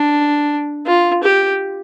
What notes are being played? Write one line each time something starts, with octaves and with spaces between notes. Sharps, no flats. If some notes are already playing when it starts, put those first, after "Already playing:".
Already playing: D4
F4
G4